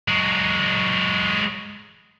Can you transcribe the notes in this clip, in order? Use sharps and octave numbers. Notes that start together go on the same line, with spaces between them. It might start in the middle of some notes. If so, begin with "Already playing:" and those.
F#3 G#3